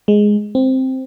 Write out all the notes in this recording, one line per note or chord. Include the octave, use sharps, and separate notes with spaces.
G#3
C4